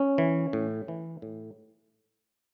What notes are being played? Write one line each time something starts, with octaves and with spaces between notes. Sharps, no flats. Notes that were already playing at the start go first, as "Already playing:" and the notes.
Already playing: C#4
E3
A2
E3
A2